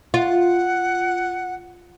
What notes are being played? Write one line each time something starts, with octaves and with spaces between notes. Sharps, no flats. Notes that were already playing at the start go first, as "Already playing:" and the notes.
F4 F#5